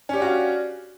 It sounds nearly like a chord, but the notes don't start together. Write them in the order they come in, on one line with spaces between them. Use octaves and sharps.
C#4 G4 D4 F#4 F5